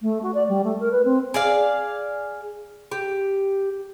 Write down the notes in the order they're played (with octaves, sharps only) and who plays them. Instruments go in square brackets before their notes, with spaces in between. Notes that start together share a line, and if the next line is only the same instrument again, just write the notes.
[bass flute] A3
F#4
D5
G3
A3
A#4
B4
C4
[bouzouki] G#4 D5 F5
G4